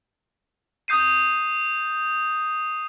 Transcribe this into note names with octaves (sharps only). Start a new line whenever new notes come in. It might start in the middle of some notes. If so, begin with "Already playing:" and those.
D#6 G6 C7 D#7